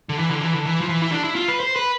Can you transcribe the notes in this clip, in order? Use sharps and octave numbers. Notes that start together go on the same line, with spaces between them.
D3
E3
D3
E3
D3
E3
F3
E3
E4
D4
E4
F4
B4
C5
B4